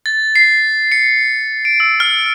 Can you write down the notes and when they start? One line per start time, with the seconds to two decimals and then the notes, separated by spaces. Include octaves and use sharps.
0.06 A6
0.36 C7
0.92 C#7
1.65 D7
1.80 E6
2.00 F6